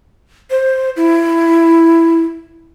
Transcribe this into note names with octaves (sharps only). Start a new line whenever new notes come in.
C5
E4